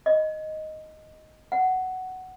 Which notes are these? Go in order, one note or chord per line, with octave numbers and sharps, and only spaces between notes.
D#5
F#5